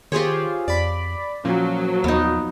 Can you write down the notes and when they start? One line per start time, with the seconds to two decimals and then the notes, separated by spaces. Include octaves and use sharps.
0.12 D#3 F4 G4 G#4 C5 C#5
0.68 F2 D5 B5
1.45 A#2 F3 F#3 C#4
2.04 D#2 B3 D#4